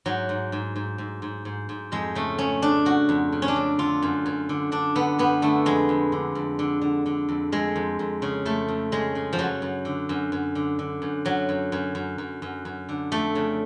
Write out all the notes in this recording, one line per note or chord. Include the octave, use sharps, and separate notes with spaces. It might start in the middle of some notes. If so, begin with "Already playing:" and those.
G#2 F#3
G#2
G#2
G#2
G#2
G#2
G#2
G#2
F2 G#3
C#3 A3
C#3 C#4
C#3 D4
C#3 F#4
F2
C#3
C#4
D4
F2
D3 F4
F#2
F#2
D3
D3 D4
D3 B3
F#2 B3
D3 A3
F2 G#3
F2
D3
F2
D3
D3
D3
F2
F2 G#3
F2
F2
C#3
F2 A3
F2
C#3 G#3
C#3
F3
F#2 F#3
F#2
D3
F#2
F#2
D3
D3
F#2
F#2 F#3
F#2
F#2
F#2
F#2
F#2
F#2
D3
F2 A3
C#3